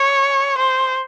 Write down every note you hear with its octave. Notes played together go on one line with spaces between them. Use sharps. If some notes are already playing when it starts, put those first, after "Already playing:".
Already playing: C#5
C5